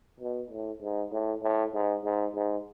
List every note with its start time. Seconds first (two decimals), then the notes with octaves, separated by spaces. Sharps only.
0.20 B2
0.50 A2
0.82 G#2
1.12 A2
1.43 A2
1.74 G#2
2.04 G#2
2.35 G#2